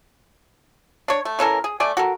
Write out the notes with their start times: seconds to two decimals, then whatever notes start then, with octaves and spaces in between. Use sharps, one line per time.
1.08 D4 C#5
1.25 A3
1.39 E3 C#4 A4 A#4
1.64 G#4
1.80 A3 D5 G#5
1.97 F#4 A4 A#4